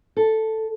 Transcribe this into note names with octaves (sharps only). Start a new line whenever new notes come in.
A4